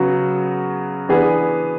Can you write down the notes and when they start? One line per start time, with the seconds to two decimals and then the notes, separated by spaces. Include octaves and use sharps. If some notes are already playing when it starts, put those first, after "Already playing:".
Already playing: C#3 F#3 B3 F#4
1.09 E3 B3 D4 G#4